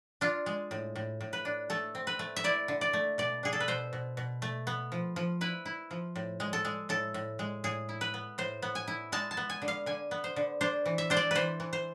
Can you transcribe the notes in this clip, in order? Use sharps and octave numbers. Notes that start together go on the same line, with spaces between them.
D4 F4
G#3
A2
A2
A2
B4
D4
A3 A4
C4
B4
A3
E5
E4 D5
D3
D5
A3
B2 D5
D4 G#4
A4
B4
B2 C5
B2
B2
A3
B3
F3
F3
E4 B4
E4
F3
A2
G#3
A4
G#3
A2 A4
A2
G#3
A2 G#4
E4
B4
B3
A2 C5
B3
G#5
E4
G#3 A5
A5
B3
G#5
D3
F5
D3 G#5
B3
C5
D3
D4 C5
E3
E5
D4 C5
D5
E3 B4 C5
E3
C5